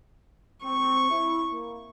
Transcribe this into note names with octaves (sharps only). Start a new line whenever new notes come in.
C4 C#6
E4
A#3